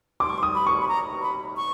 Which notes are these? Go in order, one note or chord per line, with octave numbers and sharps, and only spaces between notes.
C6 D6
C#6
C6
D#6
B5
C#6
B5
A#5
B5
C#6